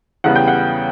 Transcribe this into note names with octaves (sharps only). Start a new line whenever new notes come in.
E2 C#3 G3 B3 F#5
G5
F#5